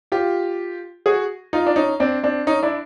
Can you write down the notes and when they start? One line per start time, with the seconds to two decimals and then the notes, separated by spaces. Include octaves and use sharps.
0.12 F4 G4
1.06 F#4 G#4
1.53 D#4 F4
1.66 D4
1.76 C#4 D#4
2.00 C4 D4
2.23 C4 D4
2.47 C#4 D#4
2.63 D4 E4